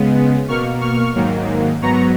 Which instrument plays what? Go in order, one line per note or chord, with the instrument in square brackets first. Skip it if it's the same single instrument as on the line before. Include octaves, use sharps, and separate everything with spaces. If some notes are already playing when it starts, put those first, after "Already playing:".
Already playing: [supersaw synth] C#3 G#3 B3
B2 A#3 C#6 F6
C#6 F6
G#2 D#3 F#3 A#3
G#2 F#3 B3 A#5 C#6